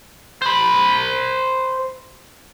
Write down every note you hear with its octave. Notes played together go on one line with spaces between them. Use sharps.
C5 B5